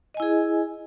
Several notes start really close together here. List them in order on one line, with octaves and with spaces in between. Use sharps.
D#5 G#5 E4 G#4